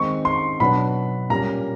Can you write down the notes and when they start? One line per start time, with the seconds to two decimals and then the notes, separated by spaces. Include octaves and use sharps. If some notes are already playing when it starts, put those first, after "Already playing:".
Already playing: D#3 G#3 C4 D#4 C#6
0.25 C6
0.60 B2 F#3 B3 D4 B5
1.30 A#2 G3 A#3 C#4 A#5